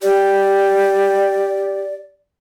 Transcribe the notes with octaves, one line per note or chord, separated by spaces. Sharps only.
G4 D5